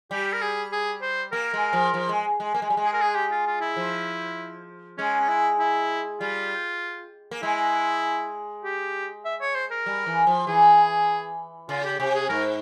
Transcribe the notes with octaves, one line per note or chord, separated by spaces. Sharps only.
G3 G4
A#4
G#4
G#4
C5
A#3 A#4
G#3
F3
F3
G#3
G#3
A#3
G#3
G3
G#3
G#4
A#4
G#4
G4
F4
F4
E4
F3
G#3 C#4
C#4
E4
E4
G3 F4
A#3
G#3 E4
G4
E5
C#5
C5
A#4
G3
E3
F3
E3 G#4
C#3 F4
G4
C3 G4
G#4
G#2 A#4